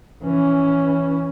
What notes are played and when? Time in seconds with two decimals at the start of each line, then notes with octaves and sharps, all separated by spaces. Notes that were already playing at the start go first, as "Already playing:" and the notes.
0.23 E3 C#4